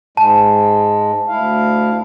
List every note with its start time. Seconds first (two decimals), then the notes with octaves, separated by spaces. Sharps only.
0.17 G#2 G#3 A5
1.28 D2 E4 F5